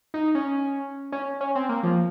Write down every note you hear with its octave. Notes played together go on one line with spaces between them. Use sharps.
D#4
C#4
C#4
C#4
C4
A#3
F3